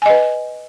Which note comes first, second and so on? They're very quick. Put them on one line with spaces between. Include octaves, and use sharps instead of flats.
G#5 D#5 B4